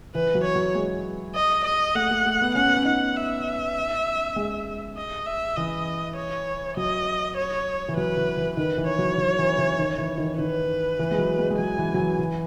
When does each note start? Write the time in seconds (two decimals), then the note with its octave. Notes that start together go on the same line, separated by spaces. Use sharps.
0.15 E3 B4
0.35 F#3
0.44 C#5
0.55 F#3
0.75 G#3
1.35 D#5
1.65 D#5
1.95 A3 F#5
2.11 A3
2.25 A3
2.41 B3
2.55 C#4 F#5
2.66 B3
2.76 C#4
2.85 D#4 F#5
3.16 E5
4.36 G#3
4.97 D#5
5.27 E5
5.57 E3 D#5
6.17 C#5
6.77 F#3 D#5
7.37 C#5
7.89 E3
7.97 F#3 B4
8.17 E3
8.37 E3
8.57 D#3 B4
8.78 E3
8.88 C#5
8.98 F#3
9.18 F#3
9.38 E3
9.58 E3
9.78 D#3
9.98 E3
10.18 D#3
10.38 D#3 B4
10.99 E3
11.11 G#3
11.18 F#3
11.39 G#3
11.50 G#3
11.58 F#3 G#5
11.78 E3
11.94 F#3
11.99 E3
12.19 E3